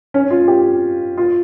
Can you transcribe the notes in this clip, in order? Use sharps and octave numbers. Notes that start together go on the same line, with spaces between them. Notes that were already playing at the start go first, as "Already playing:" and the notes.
C#4
F4
G4
F4